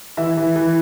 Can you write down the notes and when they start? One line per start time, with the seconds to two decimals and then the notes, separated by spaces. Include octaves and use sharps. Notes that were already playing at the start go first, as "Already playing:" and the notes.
0.17 E3 E5
0.37 E3
0.56 E3